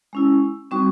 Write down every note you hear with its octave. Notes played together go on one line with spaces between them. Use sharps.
G#3 C#4 E4
G3 C4 D#4 F#4 C#6